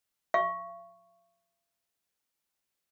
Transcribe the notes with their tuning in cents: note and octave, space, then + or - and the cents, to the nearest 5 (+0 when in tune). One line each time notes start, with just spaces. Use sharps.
F5 -45 C#6 +0